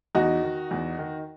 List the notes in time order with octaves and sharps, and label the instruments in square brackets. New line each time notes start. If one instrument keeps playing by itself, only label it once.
[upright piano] E2 D#4 F#4
D#3
E2
D#3